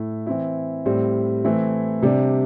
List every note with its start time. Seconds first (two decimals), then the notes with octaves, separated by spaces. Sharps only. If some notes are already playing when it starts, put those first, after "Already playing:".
Already playing: A2 A3 E4
0.27 E3 C4 E4
0.86 A2 G3 C4
1.44 E3 A3 C4 E4
2.02 C3 G3 D4